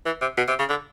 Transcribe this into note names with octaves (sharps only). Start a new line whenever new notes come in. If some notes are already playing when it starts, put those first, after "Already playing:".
E3
C3
B2
C3
C#3
D3